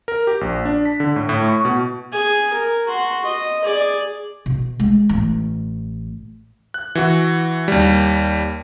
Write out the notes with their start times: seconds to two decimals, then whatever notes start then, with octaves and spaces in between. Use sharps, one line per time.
0.08 A#4
0.27 G4
0.41 A#1
0.65 D4
0.85 B6
1.00 D3
1.16 A2
1.29 A2
1.49 C#6
1.65 B2
2.12 G#4 G#5
2.53 A#4
2.88 F#4 C6
3.25 D#5
3.64 G#4 D5
4.46 B2
4.80 G#3
5.09 A1 E3
6.74 F#6
6.95 E3 F#4
7.68 D#2 G3